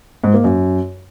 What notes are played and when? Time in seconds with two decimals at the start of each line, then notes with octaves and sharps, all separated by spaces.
0.24 G#2
0.34 A#3
0.44 F#2